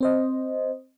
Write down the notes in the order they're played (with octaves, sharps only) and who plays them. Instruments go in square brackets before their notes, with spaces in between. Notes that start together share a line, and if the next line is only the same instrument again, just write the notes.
[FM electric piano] C4 C5 D#5